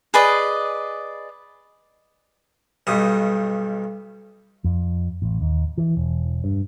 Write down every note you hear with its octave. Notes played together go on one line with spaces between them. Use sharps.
G#4 B4 D5 D#5
B1 G2 D#3 G3 D#6
F2
A1
D#2
E3
E1
G2